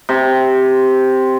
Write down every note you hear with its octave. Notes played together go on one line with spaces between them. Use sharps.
C3